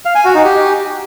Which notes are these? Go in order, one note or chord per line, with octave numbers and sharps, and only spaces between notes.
F5
G#5
F#4
D#4
G4